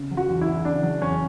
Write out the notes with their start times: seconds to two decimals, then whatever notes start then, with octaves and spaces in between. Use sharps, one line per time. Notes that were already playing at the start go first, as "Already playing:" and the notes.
Already playing: C#3
0.11 F#3
0.17 F#4
0.29 E2
0.41 E4
0.48 E2
0.65 C#3 D4
0.83 F#3
1.01 E2 C#4